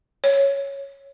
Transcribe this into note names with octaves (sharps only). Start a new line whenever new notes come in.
C#5